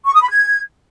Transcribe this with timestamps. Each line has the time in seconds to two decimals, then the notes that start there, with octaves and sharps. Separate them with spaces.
0.05 C#6
0.13 D#6
0.22 B5
0.30 G#6